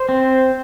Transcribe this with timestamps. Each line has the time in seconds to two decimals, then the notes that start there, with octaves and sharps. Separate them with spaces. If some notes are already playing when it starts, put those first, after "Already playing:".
Already playing: C5
0.09 C4